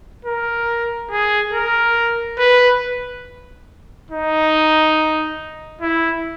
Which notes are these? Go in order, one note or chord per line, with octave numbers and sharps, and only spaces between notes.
A#4
G#4
A#4
B4
D#4
E4